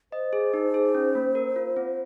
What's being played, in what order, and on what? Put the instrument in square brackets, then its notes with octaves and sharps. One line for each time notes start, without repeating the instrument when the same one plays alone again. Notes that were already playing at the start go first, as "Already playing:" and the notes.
[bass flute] C5 [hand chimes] D#5
[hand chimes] G#4
D#4
G#4
C#4
A#3
A#4
F4
C4